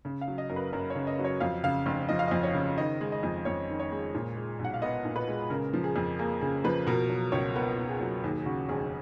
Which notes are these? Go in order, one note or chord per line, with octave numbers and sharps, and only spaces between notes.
C#3
F5
F#3
D#5
F#2 A#4
B4
F#2 A#4
C#5
C#3
D#5
F#3
C#5
F2 F5
C#3 F5
F1
F3 D#5
F5
F2 D#5
C#5
C#3
D#3 D#5
G#3
D#5
F2
F2 C#5
D#3
C#5
G#3
A#2
G#3
B1
F#5
F5
B3 D#5
A#2
B4
G#3
C#3 A#4
F3
G#4
F2
A#3 G#4
C#3 G#4
F3 B4
B2 A#4
F#3
C#2 C#5
B3 A#4
B2
G#4
F#3
D#2 G#4
G#4
C#3 F#4
F1 G#4